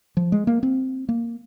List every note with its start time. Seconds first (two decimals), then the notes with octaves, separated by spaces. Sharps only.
0.17 F3
0.32 G#3
0.47 A#3
0.63 C4
1.09 A#3